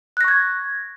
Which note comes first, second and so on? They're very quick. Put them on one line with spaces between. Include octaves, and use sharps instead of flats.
F#6 A#6 C#6 G#6